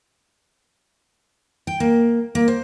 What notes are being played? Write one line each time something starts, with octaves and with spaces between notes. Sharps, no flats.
G5
A#3
A#3
C5